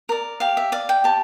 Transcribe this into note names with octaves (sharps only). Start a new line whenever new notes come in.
A#4 D5
G4 F5
E5
D5 F5
G5
G4 A5